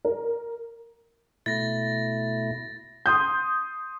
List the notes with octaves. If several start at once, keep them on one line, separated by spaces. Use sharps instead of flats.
A#4
B2 A3 E4 A6 A#6
C6 D#6 G6